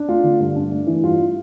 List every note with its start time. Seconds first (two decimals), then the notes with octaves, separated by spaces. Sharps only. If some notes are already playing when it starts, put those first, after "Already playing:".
Already playing: D4
0.08 A3 F4
0.23 D3
0.40 G2
0.56 D4
0.72 A3
0.87 E3
1.03 G2 F4